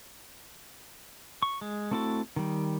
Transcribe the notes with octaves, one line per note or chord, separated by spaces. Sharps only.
C#6
G#3
A3 C4 E4 F#4 A4
D#3 G3